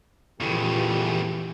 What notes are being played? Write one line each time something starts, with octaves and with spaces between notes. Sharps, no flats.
A1 E2 A#2 C#3 E3 F3 G4 A4